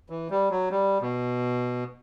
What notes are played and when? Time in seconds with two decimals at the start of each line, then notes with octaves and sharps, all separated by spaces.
0.10 E3
0.30 G3
0.50 F#3
0.71 G3
1.02 B2